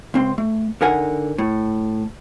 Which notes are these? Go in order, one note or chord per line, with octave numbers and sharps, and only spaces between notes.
C#2 C4 C6
A3
D3 D#4 A#4 F#5 G#5
A2